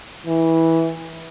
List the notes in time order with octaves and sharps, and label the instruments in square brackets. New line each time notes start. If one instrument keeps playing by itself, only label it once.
[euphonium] E3